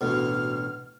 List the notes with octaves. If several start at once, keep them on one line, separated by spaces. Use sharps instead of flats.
A1 D2 B2 F6